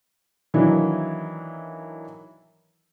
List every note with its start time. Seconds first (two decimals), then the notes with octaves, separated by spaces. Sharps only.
0.54 D#3 E3 F#3 A#3 D4 E4